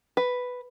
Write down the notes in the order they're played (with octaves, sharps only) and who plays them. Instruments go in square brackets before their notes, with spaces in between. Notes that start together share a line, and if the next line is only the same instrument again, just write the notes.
[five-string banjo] B4